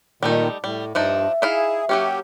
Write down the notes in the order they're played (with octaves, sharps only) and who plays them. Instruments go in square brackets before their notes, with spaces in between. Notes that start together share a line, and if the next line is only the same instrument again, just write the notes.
[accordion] A#2 D#3 [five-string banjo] G3 A3 D#4
[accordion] A2 [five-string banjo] G3
[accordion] G2 [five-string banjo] F3 D4 D#4 [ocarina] E5
[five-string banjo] D#4 E4 F5 [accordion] G#4
[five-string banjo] F#3 A#3 C#4 [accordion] G4